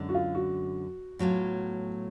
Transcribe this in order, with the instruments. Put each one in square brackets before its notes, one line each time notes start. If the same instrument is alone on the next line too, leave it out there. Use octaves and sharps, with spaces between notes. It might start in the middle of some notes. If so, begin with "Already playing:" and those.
Already playing: [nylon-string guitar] F#2 D3 G#3
[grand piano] F#4
F4
F#4
[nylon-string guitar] A2 F#3 B3 F4